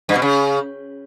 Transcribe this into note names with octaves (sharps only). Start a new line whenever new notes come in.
G2
B2
C#3